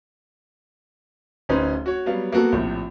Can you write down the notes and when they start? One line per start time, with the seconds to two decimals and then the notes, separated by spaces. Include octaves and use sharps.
1.49 D1 C#4 D#4 B4 C5
1.86 F#4 C#5
2.06 F#3 G3 B3 F5
2.32 A#3 B3 F#4 A4
2.52 A#1 A2 C3